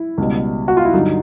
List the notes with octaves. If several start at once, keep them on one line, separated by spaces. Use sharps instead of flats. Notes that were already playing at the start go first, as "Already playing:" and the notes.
Already playing: E4
C#2 B2 G3
F#4
F4
E4
G2 D3 F#3 D#4